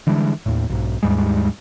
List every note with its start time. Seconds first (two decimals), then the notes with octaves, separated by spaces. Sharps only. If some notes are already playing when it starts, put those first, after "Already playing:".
0.07 D3 E3 G3 G#3
0.46 D#2 A2
0.70 B1 G#2
1.03 D#2 G#2 G3 G#3